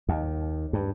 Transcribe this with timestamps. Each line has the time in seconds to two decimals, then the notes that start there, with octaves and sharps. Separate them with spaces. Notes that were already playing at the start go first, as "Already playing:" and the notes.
0.09 D#2
0.73 G2